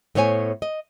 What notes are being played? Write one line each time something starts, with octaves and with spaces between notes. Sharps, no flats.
A2 B3 C5 C#5 F5 G#5
D#5